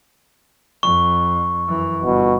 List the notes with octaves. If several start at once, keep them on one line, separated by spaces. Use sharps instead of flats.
F2 C#6
F#2 E3
G1 B2